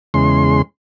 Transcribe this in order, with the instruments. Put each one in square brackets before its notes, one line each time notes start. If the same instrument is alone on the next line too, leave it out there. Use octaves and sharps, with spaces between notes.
[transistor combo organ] E2 C#3 G#3 C6